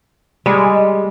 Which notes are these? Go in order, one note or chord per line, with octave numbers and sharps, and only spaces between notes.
G3 G#3